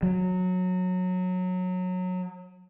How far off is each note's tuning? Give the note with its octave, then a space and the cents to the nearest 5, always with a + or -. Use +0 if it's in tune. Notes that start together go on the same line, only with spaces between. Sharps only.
F#3 -15